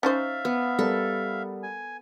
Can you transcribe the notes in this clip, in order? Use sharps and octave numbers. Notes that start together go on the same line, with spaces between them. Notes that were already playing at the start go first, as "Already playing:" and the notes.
C#4 D#4 C5 E5 F5 A6
B3
G3 B3 A4 A#4
G#5